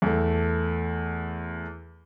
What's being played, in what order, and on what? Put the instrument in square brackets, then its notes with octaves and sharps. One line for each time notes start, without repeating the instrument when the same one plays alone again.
[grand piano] E2 A3